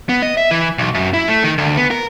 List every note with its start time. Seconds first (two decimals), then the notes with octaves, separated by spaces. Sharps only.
0.09 B3
0.22 D#5
0.37 E5
0.51 E3
0.78 B1
0.94 F#2
1.13 E4
1.28 A3
1.44 D#3
1.58 D2
1.77 B3
1.91 A#4